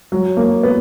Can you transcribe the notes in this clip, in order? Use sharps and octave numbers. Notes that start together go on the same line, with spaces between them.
F#3
A#3
B3